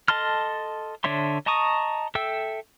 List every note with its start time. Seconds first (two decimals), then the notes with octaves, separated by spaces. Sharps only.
0.08 A4 D#5 A5 C6 F6
1.04 D3 D4 C#5 E5 C6
1.46 D#5 A5 A#5 C#6 D#6
2.15 A4 E5 G5 E6